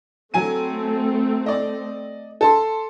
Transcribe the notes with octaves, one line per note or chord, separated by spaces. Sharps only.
F#3 A3 C4 G#5 D#7
D5 D#5
A4 A5 C6